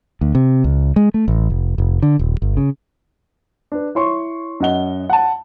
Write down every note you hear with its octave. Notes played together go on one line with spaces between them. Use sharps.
D2
C3
C#2
G#3
A3
A1
F1
F1
D3
D#1
G1
C#3
D4 B4
E4 C#5 C6 C#6
F#2 D#5 F#5 G7
F#5 A5